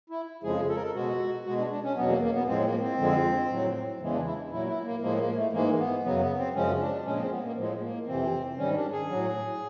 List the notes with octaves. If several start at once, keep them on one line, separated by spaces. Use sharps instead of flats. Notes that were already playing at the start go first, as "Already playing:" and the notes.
E4
F2 C#3 F3 G#3 G#4
A4
A#4
A4
B2 G#3 F#4
B2 G#3 F#4
D4
D4
C#4
E2 B2 F#3 B3
A#3
A#3
B3
A2 F3 G#3 C4
A#3
C4
F2 D3 F3 G#3
A2 F#3
E2 C#3 E3 G#3
D4
E4
A#2 F#3 E4
E4
A#3
A2 F3 G#3 A#3
A#3
A3
G#2 E3 G#3 A#3
B3
F#2 C#3 F#3 B3
B3
C4
F#2 C#3 F3 G#3 C#4
D4
A#2 F3 G#3 C#4
C4
B3
A#3
A2 F3 G#3
A#3
F2 C3 E3 C4
G#2 D#3 G3 C#4
D4
G#4
A2 F#3